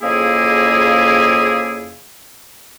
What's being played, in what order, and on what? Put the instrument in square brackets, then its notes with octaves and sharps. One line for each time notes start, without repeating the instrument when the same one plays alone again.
[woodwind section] F2 C#3 A#3 E4 G#4